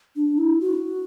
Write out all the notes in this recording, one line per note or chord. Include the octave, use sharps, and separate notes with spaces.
D4
E4
F#4